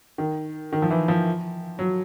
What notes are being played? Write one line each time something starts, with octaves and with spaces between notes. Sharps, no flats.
D#3
D#3
F3
E3
F3
F#3